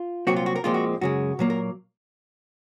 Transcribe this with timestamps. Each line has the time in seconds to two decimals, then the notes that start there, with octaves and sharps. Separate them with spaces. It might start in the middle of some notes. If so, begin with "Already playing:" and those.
Already playing: F4
0.27 C2 A#2 F#3 C4 F#4
0.36 F4
0.46 F#4
0.56 A#4
0.64 A#2 F3 G#3 C4 F4
0.74 F#4
1.01 F#2 C#3 G#3 F#4
1.39 A#2 F#3 A#3
1.50 A#4